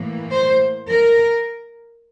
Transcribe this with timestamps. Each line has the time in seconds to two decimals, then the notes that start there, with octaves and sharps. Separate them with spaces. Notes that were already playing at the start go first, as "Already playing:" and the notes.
Already playing: A2 E3 A#3
0.31 C5
0.88 A#4